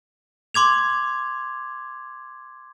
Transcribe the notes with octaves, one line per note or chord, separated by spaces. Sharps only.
C6 D6 G#6 F7